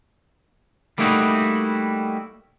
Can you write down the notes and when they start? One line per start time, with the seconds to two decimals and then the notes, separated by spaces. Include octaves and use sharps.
0.98 G3 A3 A#3 D#4 E4 F#4